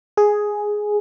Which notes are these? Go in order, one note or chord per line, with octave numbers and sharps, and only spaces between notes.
G#4